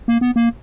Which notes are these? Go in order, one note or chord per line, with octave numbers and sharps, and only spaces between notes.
A#3
B3
A#3